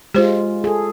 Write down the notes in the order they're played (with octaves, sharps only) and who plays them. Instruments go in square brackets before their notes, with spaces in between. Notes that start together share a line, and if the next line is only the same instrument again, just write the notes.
[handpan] G#3 F4 [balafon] G4 C5
[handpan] G#4 A4